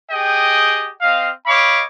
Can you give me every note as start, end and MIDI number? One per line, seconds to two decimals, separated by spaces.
0.11 0.91 67
0.11 0.91 68
0.11 0.91 75
0.11 0.91 79
1.01 1.30 60
1.01 1.30 75
1.01 1.30 77
1.47 1.83 73
1.47 1.83 75
1.47 1.83 77
1.47 1.83 83
1.47 1.83 86